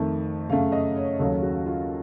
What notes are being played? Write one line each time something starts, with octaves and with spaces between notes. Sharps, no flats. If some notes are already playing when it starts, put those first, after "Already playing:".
Already playing: F2 D#3 A3
F#2 C#3 A3 F5
D#5
C#5
D#2 C#3 F#3 A4
F#4
F4